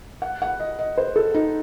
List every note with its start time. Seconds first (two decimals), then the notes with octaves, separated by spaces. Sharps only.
0.22 F#5
0.42 F#5
0.60 D#5
0.79 D#5
0.98 C5
1.16 A4
1.34 D#4